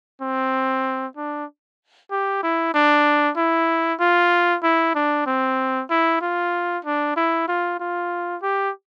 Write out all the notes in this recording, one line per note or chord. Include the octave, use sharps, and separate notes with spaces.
C4
D4
G4
E4
D4
E4
F4
E4
D4
C4
E4
F4
D4
E4
F4
F4
G4